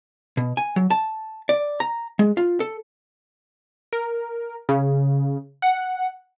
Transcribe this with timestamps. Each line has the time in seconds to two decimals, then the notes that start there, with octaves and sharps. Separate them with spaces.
0.37 B2
0.57 G#5
0.76 F#3
0.90 A5
1.49 D5
1.80 A#5
2.19 G#3
2.37 F4
2.60 A4
3.93 A#4
4.69 C#3
5.62 F#5